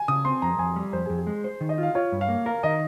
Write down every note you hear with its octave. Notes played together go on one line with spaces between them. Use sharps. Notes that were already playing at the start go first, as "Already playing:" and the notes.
Already playing: G#5
C#3 D#6
C4 C6
F2 A#5
F2 G#5
G3
F2 C5
G#4
F2
G#4
G#3
C5
D#3
D#5
F4
F5
F4 C#5
G2
F5
A#3
A#4 F5
D#3 D#5